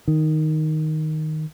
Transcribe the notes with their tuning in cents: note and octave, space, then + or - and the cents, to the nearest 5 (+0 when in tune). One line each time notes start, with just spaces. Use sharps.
D#3 +0